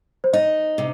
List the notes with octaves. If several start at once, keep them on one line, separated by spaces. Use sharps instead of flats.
C5
D#4 D#5
C3